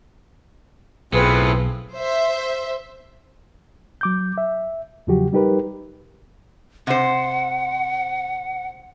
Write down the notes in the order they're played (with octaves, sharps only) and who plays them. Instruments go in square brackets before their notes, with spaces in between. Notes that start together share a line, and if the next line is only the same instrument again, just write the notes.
[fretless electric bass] B1 [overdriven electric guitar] A2 [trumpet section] C4 F4 G#4 [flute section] B4
[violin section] C5 E5
[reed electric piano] F#3 D6 G6
E5
E2 C#3 F3 F#3 F#4 G4
G3 D#4 G4 A#4 B4
[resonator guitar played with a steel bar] C3 C5 [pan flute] F#5